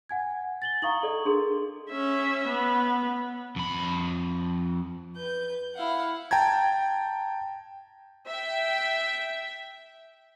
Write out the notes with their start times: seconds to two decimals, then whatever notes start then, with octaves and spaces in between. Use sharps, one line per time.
0.09 F#5 G#5 G#6
0.62 A6 F#7 G7
0.82 E4 F5 A#5 C#6 D#6 F#7
1.03 A4 D5 D#5
1.25 D4 G#4 A#4 C6
1.91 C#4 E5
2.48 B3
3.56 F2 B5
5.16 B4 G6
5.75 E4 F5 F#5
6.31 G5 A5 A#5 G#6
8.26 E5 G5